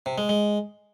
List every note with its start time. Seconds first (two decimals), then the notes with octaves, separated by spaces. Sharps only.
0.06 C3
0.18 G#3
0.29 G#3